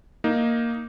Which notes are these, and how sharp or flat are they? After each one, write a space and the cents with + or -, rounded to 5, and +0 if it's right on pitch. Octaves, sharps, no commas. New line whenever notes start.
A#3 +0 D#4 +0